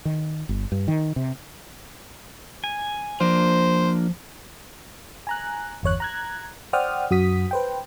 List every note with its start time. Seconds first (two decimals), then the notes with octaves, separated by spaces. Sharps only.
0.05 D#3
0.49 G1
0.72 G2
0.88 D#3
1.16 C3
2.64 G#5
3.20 F3 A#3 D4 F4 C5
5.27 G#5 A#5 F#6
5.83 G1 E2 C#5 F#6
6.00 A#5 F#6 G#6
6.73 C5 D5 F#5 G5 D#6 F6
7.10 F#2 F#4 D#6 B6
7.51 B4 C5 G5